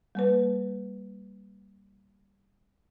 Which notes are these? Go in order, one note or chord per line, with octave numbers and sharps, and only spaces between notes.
G3 A#3 B4